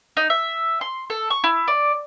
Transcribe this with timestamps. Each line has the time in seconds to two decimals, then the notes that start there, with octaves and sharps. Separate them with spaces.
0.17 D#4
0.30 E5
0.81 C6
1.10 A4
1.30 C#6
1.44 E4
1.68 D5